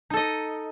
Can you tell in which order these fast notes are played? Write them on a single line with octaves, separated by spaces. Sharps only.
D#4 A4 D#5